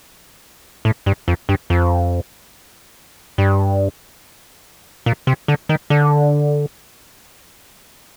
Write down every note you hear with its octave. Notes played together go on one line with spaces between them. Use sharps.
A2
G2
F2
G2
F2
G2
A#2
C3
D3
D#3
D3